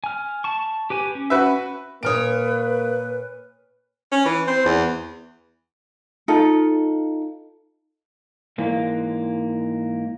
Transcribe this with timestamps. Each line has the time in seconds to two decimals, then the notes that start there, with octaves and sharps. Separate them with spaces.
0.04 G#5 F6
0.44 A5 C#6
0.90 G4 B4 G#5
1.15 C#4
1.30 F#4 B4 E5
2.03 A#2 A#3 B4 C#5 D#6 F6 D7
4.12 C#4
4.25 E3
4.47 C4
4.65 E2
6.28 D#4 F4 A4
8.58 G#2 E3 A#3